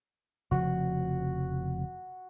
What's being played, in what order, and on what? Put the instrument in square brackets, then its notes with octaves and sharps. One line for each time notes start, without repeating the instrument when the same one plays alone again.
[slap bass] F1 C#3 F3 [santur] F#4